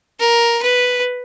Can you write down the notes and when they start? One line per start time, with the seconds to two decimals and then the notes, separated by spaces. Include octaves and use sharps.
0.19 A#4
0.62 B4